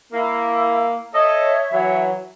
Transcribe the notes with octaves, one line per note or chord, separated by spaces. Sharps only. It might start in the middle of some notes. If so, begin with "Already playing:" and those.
A#3 E4
A4 C#5 D#5 E5
E3 F#3